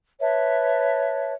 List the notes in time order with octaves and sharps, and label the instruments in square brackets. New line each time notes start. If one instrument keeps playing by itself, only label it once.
[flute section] B4 C#5 E5 A5